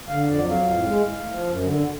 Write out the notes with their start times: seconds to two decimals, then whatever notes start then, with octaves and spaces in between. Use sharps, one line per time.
0.08 D3 F5
0.24 F2
0.29 D5
0.38 F#3
0.50 F5
0.55 F2
0.70 A2
0.85 G#3
1.01 A2
1.16 A2
1.31 F3
1.47 F#2
1.63 D3